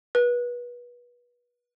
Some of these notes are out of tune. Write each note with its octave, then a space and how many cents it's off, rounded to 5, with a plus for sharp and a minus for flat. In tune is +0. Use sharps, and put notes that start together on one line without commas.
B4 -30